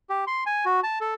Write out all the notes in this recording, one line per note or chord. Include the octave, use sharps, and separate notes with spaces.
G4
C6
G#5
F#4
A5
A4